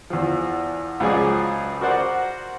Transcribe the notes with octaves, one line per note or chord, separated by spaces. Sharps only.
E2 F3
C#2 F3 F#3 G#4 D5 G#5
F#4 A#4 C5 D5 F#5